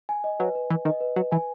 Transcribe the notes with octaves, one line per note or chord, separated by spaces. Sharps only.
G#5
D#5
F#3 B4
B4
E3 G#5
D#3 D#5
B4
F#3 B4
E3 G#5